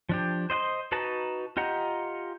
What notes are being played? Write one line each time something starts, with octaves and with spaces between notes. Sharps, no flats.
F3 D4 G4
C5 D#5 F#5 C6
D#4 F#4 B4 A5 A#5
F4 G4 D#5 F#5 A#5